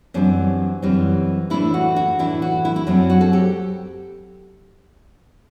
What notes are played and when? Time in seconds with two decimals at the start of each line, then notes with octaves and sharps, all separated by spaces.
0.14 F#2 E3 G3 C4 D4
0.82 F#2 E3 G3 C4
1.50 A2 E3 A3 D4 E4
1.74 F#4
1.96 F#4
2.19 A2 E3 A3 D4 E4
2.42 F#4
2.65 E4
2.76 E4
2.87 F#2 F#3 C4 D4
3.10 F#4
3.21 A4
3.33 G4